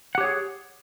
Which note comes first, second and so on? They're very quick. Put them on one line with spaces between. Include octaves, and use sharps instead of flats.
F#5 G4 C#5 G#4